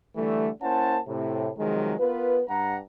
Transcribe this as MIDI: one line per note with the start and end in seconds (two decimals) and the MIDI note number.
0.16 0.49 50
0.16 0.49 52
0.16 0.49 55
0.16 0.49 57
0.62 1.00 58
0.62 1.00 61
0.62 1.00 64
0.62 1.00 72
0.62 1.00 78
0.62 1.00 81
1.07 1.50 45
1.07 1.50 48
1.58 1.95 48
1.58 1.95 51
1.58 1.95 53
1.58 1.95 54
1.58 1.95 56
2.00 2.41 59
2.00 2.41 65
2.00 2.41 70
2.00 2.41 71
2.49 2.78 43
2.49 2.78 78
2.49 2.78 82